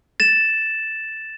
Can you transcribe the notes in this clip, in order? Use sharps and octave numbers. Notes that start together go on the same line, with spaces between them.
A6 E7